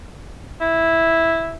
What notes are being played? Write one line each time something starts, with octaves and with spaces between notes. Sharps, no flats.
E4